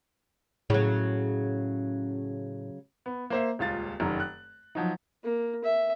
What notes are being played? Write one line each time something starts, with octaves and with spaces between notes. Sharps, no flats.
A2 C#3 F#3
B3
A#3 C5 E5
D#1 C#2 F4 A6
F1 F#2 D#3
F#6
F3 F#3 D#4
A#3
E5